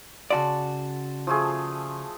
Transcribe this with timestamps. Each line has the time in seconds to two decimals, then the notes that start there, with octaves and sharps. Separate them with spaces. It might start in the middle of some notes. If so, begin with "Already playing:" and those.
0.30 C#3 F#4 D5 A5 C6
1.27 F3 A3 G#4